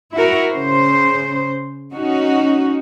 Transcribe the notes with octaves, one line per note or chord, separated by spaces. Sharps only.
E4 F#4 A#4
C#3 C5
C#4 D#4 F#4